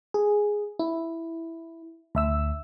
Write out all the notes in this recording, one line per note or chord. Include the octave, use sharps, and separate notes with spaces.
G#4
E4
D2 E5 E6